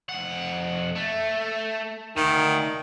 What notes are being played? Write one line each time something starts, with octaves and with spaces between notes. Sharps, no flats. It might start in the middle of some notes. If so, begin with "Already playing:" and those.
F2 F#5
A3
D2 D#3